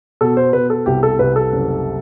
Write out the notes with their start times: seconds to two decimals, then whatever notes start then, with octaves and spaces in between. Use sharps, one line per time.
0.21 B2 A4
0.37 C5
0.53 B2 B4
0.70 A4
0.86 C2 G4
1.03 A4
1.19 C2 B4
1.36 A4
1.52 F#1